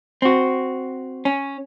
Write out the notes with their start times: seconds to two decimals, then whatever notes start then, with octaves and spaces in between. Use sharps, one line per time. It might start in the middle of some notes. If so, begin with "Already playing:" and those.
0.22 C4 F#4
1.25 C#4